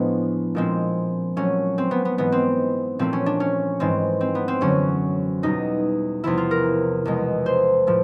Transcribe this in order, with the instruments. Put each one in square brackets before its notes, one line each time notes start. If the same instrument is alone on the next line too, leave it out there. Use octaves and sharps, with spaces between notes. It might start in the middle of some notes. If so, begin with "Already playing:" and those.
Already playing: [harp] A2 F3 G#3 B3 D4
A#2 F3 G#3 C4
A#2 F#3 A3 C#4
C4
B3
B3
G#2 E3 G#3 B3
C4
A#2 F3 A3 C4
C#4
D4
C#4
G#2 E3 G#3 C4
C4
B3
C4
F#2 D3 F#3 C#4
E2 B2 G3 D#4
E2 C3 F3 E4
F4
A#4
E2 B2 G#3
C5
A2 F3 A3